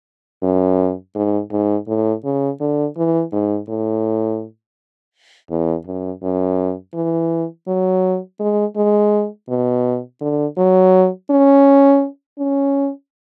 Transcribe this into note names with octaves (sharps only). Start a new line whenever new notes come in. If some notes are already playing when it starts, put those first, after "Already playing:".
F#2
G#2
G#2
A2
C#3
D3
E3
G#2
A2
E2
F#2
F#2
E3
F#3
G#3
G#3
B2
D3
F#3
C#4
C#4